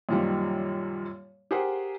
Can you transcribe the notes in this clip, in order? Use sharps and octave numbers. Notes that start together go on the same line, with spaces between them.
F#2 A#2 D#3 F3 G3
G4 G#4 A#4 C5 F#5